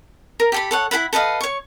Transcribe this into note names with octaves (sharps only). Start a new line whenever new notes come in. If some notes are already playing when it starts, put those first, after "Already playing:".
A#4
G4 A4 B5
A4 C#5 F#5
E4 A4 F#5 B5
A4 B4 D#5 F5
C#5 C#6